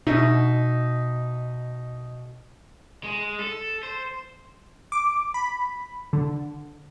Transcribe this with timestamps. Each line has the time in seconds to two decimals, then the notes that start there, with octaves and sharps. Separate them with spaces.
0.07 B2 D#4 E5
3.04 G#3
3.40 A4
3.83 C5
4.92 D6
5.34 B5
6.13 D3